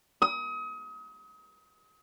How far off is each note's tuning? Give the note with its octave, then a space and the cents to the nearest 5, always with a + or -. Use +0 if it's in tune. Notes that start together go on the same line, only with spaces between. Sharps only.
D#6 +35